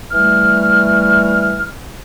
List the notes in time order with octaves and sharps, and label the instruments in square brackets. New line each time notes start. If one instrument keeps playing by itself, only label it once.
[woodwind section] E3 G3 A3 F6